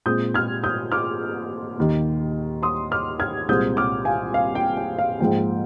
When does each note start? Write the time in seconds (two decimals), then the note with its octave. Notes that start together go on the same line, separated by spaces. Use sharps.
0.06 A#2 G#3 C4 D#6 G6
0.34 F6 G#6
0.64 D#6 G6
0.92 D6 F6
1.78 D#2 D#3 A#3
2.63 C6 D#6
2.92 D6 F6
3.20 F6 G#6
3.48 C2 A#2 G#3 C4 D#6 G6
3.77 D6 F6
4.05 F5 G#5
4.34 F5
4.55 G5
4.77 G5
4.99 F5
5.20 G#2 F3 A#3 G5